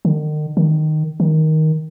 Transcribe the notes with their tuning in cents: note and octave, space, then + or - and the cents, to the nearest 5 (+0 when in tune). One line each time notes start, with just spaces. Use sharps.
D#3 -40
D#3 -10
D#3 +10